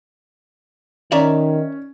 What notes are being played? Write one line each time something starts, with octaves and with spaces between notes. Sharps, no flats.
D#3 C#4 D5 E5 A#5